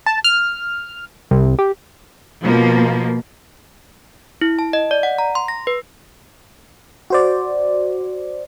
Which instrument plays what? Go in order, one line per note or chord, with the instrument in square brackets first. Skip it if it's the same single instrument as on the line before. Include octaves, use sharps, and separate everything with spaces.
[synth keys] A5
F6
C2
G4
[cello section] B2 F3 A#3
[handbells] E4
A5
D#5
D5
F#5
A#5
C6
A#6
B4
[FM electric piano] F#4 C5 D5